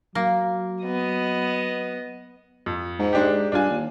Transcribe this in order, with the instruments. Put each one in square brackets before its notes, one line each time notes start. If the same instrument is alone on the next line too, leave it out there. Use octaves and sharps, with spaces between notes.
[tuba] F#3 [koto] A#3
[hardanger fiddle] B3 D#5
[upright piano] F2
[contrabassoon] G#2
[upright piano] G#3 D4 G4
[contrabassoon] G2 [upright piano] D4 F4 G#5
[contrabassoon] D#2